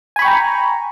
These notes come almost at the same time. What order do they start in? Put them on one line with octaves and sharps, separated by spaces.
G#5 B5 C#6 G5 A#5